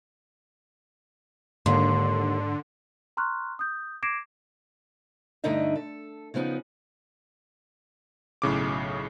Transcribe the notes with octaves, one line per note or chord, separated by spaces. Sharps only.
D#2 G#2 D3 C6
A#5 C6 C#6 F6 F#6
D#6 G6
D6 G#6 A#6 C7 D7 E7
G2 D3 A3 D#4 D#5 E5
A4
C#3 F3 B3 C#4 D#4
B1 A2 C#3 D6